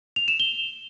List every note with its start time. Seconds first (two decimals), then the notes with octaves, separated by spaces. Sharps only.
0.16 F7
0.28 E7
0.40 G7